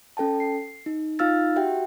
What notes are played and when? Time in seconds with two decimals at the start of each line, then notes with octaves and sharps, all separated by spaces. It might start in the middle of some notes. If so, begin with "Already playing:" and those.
0.17 C#4 A4 G5 A5
0.40 C7
0.86 D#4
1.19 D#4 F4 F5 E6 F6 A6
1.56 F#4 G4 E5 F#5 G5